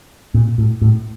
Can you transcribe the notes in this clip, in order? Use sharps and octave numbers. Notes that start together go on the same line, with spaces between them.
A#2
A2
A2